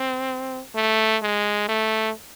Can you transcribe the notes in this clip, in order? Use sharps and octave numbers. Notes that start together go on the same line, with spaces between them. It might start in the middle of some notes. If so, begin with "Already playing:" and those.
Already playing: C4
A3
G#3
A3